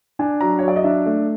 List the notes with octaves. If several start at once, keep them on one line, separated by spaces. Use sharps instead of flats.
D4 G#5
F#3 A#5
C#5
F#3 D5
D#5
D4 E5
A3